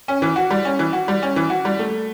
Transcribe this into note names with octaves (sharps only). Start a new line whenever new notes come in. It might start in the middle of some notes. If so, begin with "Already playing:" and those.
C#4
E3
F#4
G3
C#4
E3
F#4
G3
C#4
E3
F#4
G3
A3